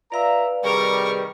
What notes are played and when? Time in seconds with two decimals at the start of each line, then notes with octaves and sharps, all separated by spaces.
0.12 F4 B4 D5 E5 F5 A#5
0.64 C3 D#3 G3 G#4 A#4 C#6